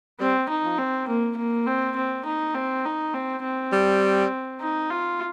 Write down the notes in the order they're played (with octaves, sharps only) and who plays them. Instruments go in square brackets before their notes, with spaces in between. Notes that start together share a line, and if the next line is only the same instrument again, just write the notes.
[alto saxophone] G3 [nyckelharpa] C4
[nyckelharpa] D#4
[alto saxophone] F3
[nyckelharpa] C4
A#3
A#3
C4
C4
D#4
C4
D#4
C4
C4
[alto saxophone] G3
[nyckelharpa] D#4
F4